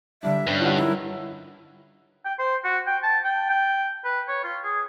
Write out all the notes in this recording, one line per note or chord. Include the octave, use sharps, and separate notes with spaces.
D3 G3 D4 E5
G2 C#4
E4 F4 D#5 F#5
D#4 E4 A#4
G5
C5
F#4
G5
A5
G5
G5
B4
C#5
F4
G#4